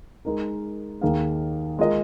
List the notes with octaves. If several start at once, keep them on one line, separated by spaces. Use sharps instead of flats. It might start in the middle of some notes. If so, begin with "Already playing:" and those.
G#3 D#4 A#4
D#2 D#3 A#3 G#4 F5
G#3 F4 A#4 D#5